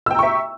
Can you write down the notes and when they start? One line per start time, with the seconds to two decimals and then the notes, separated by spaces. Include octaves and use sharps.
0.06 E6
0.11 G5
0.15 A#5
0.19 C#6
0.23 E5